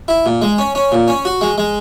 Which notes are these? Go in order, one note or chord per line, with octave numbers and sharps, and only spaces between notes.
E4
A#2
G#3
C#4
C#4
A#2
C#4
F#4
G#3
G#3